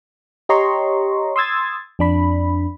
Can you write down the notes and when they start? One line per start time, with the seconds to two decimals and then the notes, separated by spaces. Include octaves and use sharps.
0.49 G4 C#5 D#5 A#5 C6 C#6
1.36 C6 D#6 E6 G#6 A6
1.99 F2 D4 B5